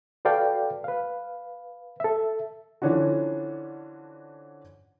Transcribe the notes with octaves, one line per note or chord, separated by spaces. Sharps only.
F#4 A4 B4 D5 F5 G5
B4 F5
A4 E5
D3 E3 F3 C#4 D4 F#4